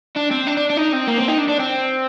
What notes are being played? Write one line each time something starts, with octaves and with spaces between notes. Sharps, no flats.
D4
C4
D4
D4
D4
D#4
C4
A#3
C4
D#4
D4
D4
C4